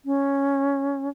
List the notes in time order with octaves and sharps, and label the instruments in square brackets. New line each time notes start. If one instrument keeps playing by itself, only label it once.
[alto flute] C#4